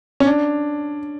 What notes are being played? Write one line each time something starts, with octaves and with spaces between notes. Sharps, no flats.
C#4
D4